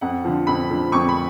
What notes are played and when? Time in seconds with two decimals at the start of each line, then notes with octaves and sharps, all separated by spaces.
0.01 F2 F#5
0.25 D3 F3
0.47 F2 B5
0.70 D3 F3
0.92 F2 C#6
1.09 B5